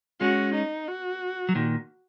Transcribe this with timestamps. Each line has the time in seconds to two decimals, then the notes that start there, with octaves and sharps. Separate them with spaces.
0.21 G#3 C#4 F#4
0.54 D#4
0.88 F#4
1.49 F#3
1.55 A#2 D#3